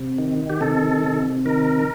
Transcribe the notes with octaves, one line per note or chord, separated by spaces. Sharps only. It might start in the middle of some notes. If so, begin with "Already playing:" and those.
Already playing: C3
D#3
G4
C3 A4
C3
D#3 A#4